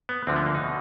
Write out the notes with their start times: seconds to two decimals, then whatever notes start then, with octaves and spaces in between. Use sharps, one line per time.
0.09 B3
0.27 D2 D3 F3 C4
0.36 B3
0.46 A#3
0.55 D#4
0.64 B2